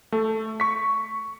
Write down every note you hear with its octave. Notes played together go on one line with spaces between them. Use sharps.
A3 A4
C#6 B6